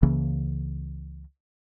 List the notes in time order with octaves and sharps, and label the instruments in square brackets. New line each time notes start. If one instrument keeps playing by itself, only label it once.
[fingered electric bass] C#2 C#3 E3 A#3